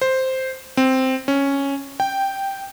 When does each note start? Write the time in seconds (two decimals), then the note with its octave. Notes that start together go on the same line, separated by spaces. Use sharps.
0.01 C5
0.77 C4
1.28 C#4
2.00 G5